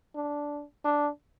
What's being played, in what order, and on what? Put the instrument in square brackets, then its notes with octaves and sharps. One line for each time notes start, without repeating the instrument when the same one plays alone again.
[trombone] D4
D4